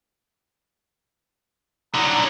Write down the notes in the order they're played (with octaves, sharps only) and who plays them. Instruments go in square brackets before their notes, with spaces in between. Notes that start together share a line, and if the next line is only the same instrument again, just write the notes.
[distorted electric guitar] D3 F#3 [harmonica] A#5 D#6